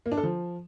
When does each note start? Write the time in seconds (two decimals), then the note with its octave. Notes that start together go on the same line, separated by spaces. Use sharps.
0.06 A#3
0.12 D4
0.17 A4
0.23 F3